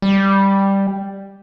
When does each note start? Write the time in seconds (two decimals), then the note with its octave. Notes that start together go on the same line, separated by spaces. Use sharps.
0.02 G3